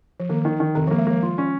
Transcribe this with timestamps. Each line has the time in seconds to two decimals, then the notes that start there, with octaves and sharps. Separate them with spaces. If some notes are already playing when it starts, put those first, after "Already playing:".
0.20 F3
0.30 D#3 A#3
0.45 D#3
0.60 D#3
0.75 F1 D#3
0.87 F3
0.91 A#3
0.98 G#3
1.07 F3 A#3
1.23 F4
1.38 C#4